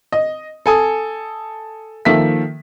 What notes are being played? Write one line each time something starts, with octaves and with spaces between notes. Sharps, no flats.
D#5
A4 G#5 D#6
D#3 F3 A#3 A4 E5 B6